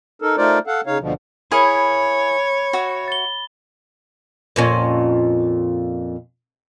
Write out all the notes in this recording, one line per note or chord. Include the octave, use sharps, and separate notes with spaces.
D#4 A4 A#4
A3 D#4 F4 A#4 C5 D5
A4 F5 F#5
C#3 D#4 C#5 F5
D2 B2 D3 F3
E4 G#4 A#4 C#5 B5
F#4 E5
A6 G7
F2 A#2 C#4